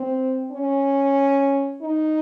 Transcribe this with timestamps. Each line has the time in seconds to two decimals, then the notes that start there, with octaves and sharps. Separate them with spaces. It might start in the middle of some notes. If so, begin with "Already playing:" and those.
Already playing: C4
0.51 C#4
1.82 D#4